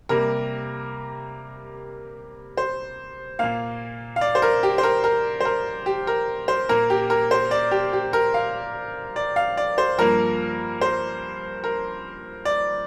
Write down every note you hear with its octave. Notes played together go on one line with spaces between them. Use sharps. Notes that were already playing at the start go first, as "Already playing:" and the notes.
C3 G3 A#3 A#4
C5
A#2 A#3 F5
F5
D5
C5
A#4
G4
C5
A#4
A#4
C5
A#4
G4
A#4
C5
A#2 A#3 A#4
G4
A#4
C5
D5
G4
G4
A#4
F5
D5
F5
D5
C5
G2 F3 A#3 A#4
C5
A#4
D5